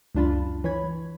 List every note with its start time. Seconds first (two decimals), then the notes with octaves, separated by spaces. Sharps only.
0.15 C#2 F#2 D4 F4 A5 B5
0.64 E3 C#5 B5 G#6